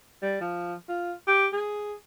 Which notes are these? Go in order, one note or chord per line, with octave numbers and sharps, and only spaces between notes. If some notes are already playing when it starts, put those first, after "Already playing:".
G3
F3
F4
G4
G#4